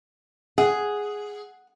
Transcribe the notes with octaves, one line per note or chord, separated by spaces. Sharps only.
G#4 F#5